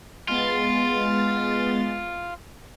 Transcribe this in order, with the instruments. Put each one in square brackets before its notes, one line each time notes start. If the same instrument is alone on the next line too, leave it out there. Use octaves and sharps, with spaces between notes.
[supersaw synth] G#3 B3 A6 [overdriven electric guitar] F4